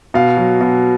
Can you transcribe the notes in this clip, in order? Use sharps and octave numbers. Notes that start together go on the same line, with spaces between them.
B2 F5
F#3
B2